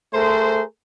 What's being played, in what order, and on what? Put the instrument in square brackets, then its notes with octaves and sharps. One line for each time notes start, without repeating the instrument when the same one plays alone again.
[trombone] A3 [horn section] G#4 A#4 C5